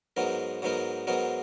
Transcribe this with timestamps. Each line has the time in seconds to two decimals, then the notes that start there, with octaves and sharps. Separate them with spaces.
0.17 G#2 F#3 B3 D#4 A#4
0.62 G#2 F#3 B3 D#4 A#4
1.07 G#2 F#3 B3 D#4 A#4